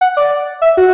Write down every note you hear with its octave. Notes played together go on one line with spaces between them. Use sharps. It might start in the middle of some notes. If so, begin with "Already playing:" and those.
F#5
D5
E5
F#4